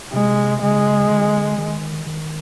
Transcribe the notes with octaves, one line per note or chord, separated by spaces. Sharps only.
C3 G#3
C#3 G#3
D3
D#3
D#3